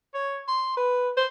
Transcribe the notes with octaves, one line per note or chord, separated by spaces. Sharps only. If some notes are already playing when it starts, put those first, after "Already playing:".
C#5
C6
B4
C5